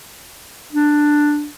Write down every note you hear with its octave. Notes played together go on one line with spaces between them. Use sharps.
D4